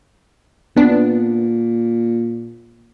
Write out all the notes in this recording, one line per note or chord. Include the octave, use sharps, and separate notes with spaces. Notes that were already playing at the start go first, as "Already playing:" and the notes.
A#2 B3 D4